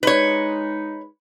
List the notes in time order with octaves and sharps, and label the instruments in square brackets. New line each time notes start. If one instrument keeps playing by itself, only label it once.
[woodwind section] G#3 D#4 [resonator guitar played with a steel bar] B4 C#5